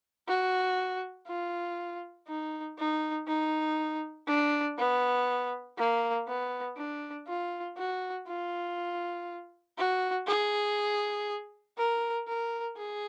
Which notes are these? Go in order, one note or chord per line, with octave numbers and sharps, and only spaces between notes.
F#4
F4
D#4
D#4
D#4
D4
B3
A#3
B3
D4
F4
F#4
F4
F#4
G#4
A#4
A#4
G#4